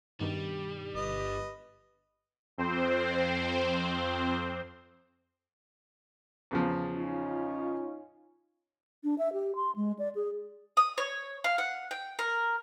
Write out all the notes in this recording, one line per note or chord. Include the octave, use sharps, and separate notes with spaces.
G2 B2 D#3 G3
G1 B4 D#5
F2 C4 C5
E2 C#3 F3
C#4 D#4 F4
D4
E5
G4
C6
G#3
D5
G#4
D#6
C#5
F5
F#5
G5
A#4